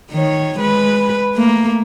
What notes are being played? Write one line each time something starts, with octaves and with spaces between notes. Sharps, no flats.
D#3 C#5
G#3 B4
A3 A#3